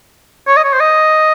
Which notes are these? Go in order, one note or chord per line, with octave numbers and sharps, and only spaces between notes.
C#5
D#5
C#5
C5
D#5